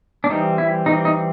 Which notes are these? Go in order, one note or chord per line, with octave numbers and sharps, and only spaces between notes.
D4
E3 G3 C4 D#4
E4
E3 G3 C4 D#4
D#4